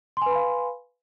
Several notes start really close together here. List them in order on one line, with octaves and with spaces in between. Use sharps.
C6 G#5 B4 B5 F5